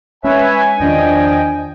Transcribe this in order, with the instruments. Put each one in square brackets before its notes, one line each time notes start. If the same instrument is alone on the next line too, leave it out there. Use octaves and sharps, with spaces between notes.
[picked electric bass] G#3 C#4 [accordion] B4 C#5 E5 [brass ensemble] G#5
[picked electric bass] E2 D#3 [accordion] F3 D#5 G5 [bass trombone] D4